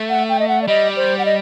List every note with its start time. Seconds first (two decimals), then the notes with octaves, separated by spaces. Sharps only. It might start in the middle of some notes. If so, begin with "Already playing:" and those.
Already playing: A3
0.09 F#5
0.29 G5
0.39 D#5
0.48 F#5
0.62 D5
0.68 G3 D#5
0.96 C5
1.19 F#5
1.25 D#5